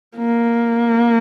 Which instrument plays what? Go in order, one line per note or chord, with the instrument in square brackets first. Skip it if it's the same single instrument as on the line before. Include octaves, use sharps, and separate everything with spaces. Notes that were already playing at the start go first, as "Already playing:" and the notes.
[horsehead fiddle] A#3